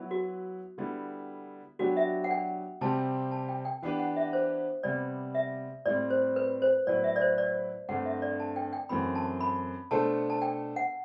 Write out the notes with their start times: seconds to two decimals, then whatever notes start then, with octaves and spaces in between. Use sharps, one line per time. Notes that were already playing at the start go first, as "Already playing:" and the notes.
Already playing: F#3 B3 E4 B4
0.11 F#4
0.78 D3 G3 B3 E4
1.79 F#3 B3 D4 F#4 G4
1.97 E5
2.24 F#5
2.31 G5
2.81 C3 G3 C4 G4 A5
3.32 A5
3.49 G5
3.65 G5
3.82 E3 B3 D4 G4 B4 F#5
4.00 F#5
4.16 E5
4.33 C5
4.83 C3 G3 B3 D5
5.35 E5
5.86 A2 G3 C4 D5
6.10 C5
6.36 B4
6.62 C5
6.87 A2 F#3 B3 E4 B4 D5
7.04 E5
7.16 D5
7.21 C5
7.38 D5
7.89 G2 D3 A3 C4 F#5
8.05 E5
8.22 D5
8.40 A5
8.56 G5
8.73 G5
8.89 F#2 E3 A3 C4 B5
9.15 A5
9.41 B5
9.91 B2 A3 D4 A4 C5 A5
10.30 A5
10.42 G5
10.76 F#5